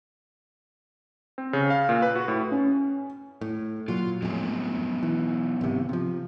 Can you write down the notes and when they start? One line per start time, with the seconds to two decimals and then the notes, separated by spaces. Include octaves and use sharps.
1.38 C4
1.53 C#3
1.70 F5
1.89 A#2
2.02 B4
2.16 F#4
2.28 A2
2.51 C#4
3.41 A2
3.88 A#2 F#3 F4
4.22 F2 A2 F#3 G#3 B3
5.03 E3
5.61 G#1 C3
5.89 C3 F3